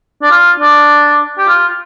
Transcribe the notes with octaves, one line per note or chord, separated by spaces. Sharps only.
D4
F4
D4
G4
F4